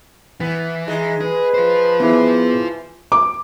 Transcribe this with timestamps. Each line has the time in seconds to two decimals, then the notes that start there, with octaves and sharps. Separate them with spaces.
0.41 E3 B3
0.88 G#3 D#4
1.21 G#4 B4
1.54 F4 C5
2.00 E3 B3 E4 G#4
3.12 D6